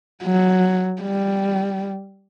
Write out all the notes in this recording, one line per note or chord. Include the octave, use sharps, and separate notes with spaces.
F#3
G3